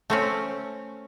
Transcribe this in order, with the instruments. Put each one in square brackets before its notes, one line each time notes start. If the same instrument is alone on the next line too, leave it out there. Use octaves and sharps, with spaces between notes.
[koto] A3 C4 C#4